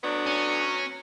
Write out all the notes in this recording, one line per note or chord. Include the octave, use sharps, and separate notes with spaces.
F#3 A3 B3 D4
C#4